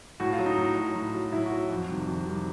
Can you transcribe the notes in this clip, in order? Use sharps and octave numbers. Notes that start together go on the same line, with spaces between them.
A2 F#4
F4
F#3
D#4
A2
F#3
A2
F#3
A2 E4
F#4
F#3
F#4
F2
C3 D#3 G3
F2
C3 D#3 G3